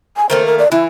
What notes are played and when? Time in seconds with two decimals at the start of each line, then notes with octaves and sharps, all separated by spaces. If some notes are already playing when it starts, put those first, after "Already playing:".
0.17 G#5
0.30 D#3 A3 A#3 C5
0.46 A#4
0.59 D5
0.72 E3 E4